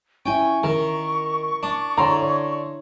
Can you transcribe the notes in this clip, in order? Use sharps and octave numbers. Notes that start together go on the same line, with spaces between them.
C#4 E4 E5 G5 G#5 C#6
D#3 A#4
D4
D3 D4 E4 C#5 A#5 C6
C#5